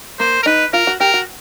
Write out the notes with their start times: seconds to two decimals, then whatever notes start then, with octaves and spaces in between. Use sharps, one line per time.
0.19 A#3 C5
0.43 A#4
0.46 D#4 B4
0.73 F4 A#4
0.87 F#4
1.00 G4 A#4
1.14 F#4